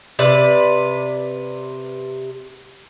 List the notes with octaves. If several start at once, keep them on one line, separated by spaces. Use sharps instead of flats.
C3 B4 D5